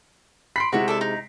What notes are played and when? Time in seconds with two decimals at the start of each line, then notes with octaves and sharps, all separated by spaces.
0.56 B5 C6 B6 C7 D7
0.72 C3 G#3 E4 F#4 C#5 E5
0.88 A4 D5 E5
1.01 D#4